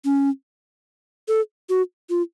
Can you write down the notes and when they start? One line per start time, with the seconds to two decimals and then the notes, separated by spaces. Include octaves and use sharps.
0.05 C#4
1.28 A4
1.69 F#4
2.10 F4